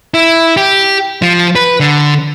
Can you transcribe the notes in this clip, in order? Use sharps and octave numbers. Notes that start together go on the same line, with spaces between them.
E4
G4
F3
B4
D3